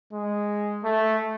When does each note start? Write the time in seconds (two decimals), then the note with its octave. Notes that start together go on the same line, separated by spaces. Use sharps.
0.13 G#3
0.84 A3